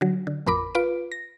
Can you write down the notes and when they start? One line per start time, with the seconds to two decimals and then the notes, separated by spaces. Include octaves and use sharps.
0.01 D3 F#3
0.27 D3
0.47 A1 F2 A#4 B5 D6
0.75 F4 B4 D7
1.12 A#6